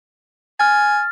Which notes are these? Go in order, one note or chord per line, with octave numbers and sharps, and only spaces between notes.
G#5 F6 A6